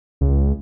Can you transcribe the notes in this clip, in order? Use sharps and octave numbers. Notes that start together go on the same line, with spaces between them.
C#2